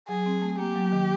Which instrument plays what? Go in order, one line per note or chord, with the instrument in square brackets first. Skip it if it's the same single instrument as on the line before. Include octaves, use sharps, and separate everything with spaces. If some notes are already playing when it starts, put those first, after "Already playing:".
[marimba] F#3 [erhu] G#4
[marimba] C4
A3
[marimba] A#3 [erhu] G4
[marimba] F#3
D#3